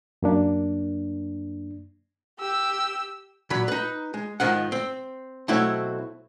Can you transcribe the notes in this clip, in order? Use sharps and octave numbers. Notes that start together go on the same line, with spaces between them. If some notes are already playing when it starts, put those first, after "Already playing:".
F#2 A#3 D4
G4 E6
A#2 F#3 B5
D#4 B4
G#3
G#2 D#3 F3 F#5
C4
B1 A3 C4 E4 F#4 C#5